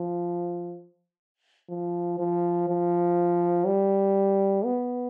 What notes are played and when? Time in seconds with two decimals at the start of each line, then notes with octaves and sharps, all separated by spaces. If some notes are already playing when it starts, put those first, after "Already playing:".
Already playing: F3
1.70 F3
2.19 F3
2.69 F3
3.66 G3
4.65 B3